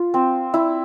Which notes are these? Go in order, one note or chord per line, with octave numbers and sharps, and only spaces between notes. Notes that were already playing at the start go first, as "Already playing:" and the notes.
Already playing: F4
C4
E4